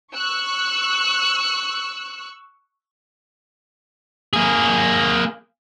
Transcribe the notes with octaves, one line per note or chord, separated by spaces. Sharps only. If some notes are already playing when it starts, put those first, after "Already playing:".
C#6 E6 F#6
A#3 G#4